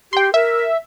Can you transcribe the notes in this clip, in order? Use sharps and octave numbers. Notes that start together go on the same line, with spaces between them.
G4 G5 C6
A#4 E5